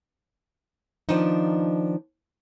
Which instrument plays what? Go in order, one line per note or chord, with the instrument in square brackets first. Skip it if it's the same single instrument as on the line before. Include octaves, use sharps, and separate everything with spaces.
[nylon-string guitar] D#3 F3 B3 D4 D#4